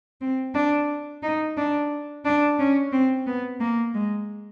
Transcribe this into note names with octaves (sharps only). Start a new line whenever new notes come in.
C4
D4
D#4
D4
D4
C#4
C4
B3
A#3
G#3